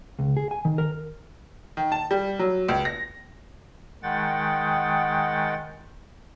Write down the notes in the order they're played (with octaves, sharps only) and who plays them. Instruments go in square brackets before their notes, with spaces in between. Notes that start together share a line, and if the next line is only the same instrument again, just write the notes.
[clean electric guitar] C#2
G#4
G#5
D#3
A#4
[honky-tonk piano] D#3
A5
G3
F#3
C#2
A#6
[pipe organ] D#3 G#3 F#5 G5 A6